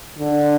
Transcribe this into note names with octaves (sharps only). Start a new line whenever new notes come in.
D3